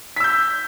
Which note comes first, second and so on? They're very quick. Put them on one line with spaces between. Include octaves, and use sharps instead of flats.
B6 E6 G6